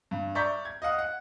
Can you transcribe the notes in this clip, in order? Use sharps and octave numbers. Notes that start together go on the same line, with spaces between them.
G2
D5 E5 A#5 C#6 G6 B6
G#6
D#5 F5 F#5 D#6
F#5